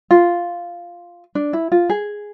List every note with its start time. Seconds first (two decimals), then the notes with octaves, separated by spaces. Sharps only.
0.11 F4
1.35 D4
1.53 E4
1.72 F4
1.90 G#4